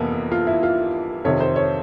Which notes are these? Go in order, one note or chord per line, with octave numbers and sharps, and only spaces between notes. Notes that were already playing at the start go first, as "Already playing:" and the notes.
Already playing: F2 C3 E3 A#3 B3
F4
E4
F4
F2 C3 D#3 C#5
C5
C#5